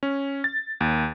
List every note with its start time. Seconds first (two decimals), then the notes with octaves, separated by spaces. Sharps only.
0.03 C#4
0.44 A6
0.81 D#2